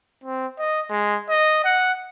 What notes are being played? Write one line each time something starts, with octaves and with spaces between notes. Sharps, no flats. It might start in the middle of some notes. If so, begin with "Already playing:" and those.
C4
D#5
G#3
D#5
F#5